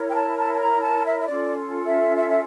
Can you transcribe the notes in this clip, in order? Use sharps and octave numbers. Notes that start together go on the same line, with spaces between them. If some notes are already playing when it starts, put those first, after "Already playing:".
Already playing: E4 A#4 C#5
G5
A5
A5
A5
A#5
A5
E5
E5
C#4 F4 A4 D5
E5
E5
E5